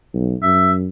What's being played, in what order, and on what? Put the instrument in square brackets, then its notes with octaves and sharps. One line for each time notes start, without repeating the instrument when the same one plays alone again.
[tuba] B1
[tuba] F#2 [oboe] E5